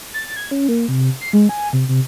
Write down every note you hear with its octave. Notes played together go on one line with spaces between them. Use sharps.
A6
G#6
C#4
A#3
C3
C7
G#3
G#5
C3
C3